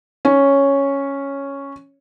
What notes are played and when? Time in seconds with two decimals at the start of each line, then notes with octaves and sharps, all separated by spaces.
0.25 C#4 C#5